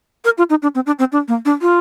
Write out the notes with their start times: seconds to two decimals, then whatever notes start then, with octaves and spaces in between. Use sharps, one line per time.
0.25 A#4
0.38 F4
0.50 D#4
0.62 D4
0.75 C4
0.86 D4
0.99 C4
1.12 D4
1.28 A#3
1.45 D4
1.61 F4